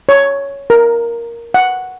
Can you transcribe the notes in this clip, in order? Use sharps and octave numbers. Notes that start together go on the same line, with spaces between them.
C#5
A#4
F#5